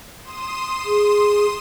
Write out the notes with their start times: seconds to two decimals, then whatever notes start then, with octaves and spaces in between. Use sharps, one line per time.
0.22 C6 D#6 E7
0.85 G#4